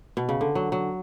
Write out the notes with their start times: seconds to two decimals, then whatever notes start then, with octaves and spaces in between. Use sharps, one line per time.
0.17 B2
0.29 C#3
0.41 D3
0.55 F#3
0.72 F#3